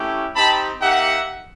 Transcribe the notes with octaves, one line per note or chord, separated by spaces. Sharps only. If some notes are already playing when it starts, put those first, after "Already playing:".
Already playing: A3 C#4 E4 G4
C4 D#4 G4 A5 B5
A#3 D#4 G4 E5 F#5